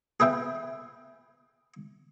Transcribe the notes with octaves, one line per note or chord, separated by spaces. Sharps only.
G#4 B4 E5 G5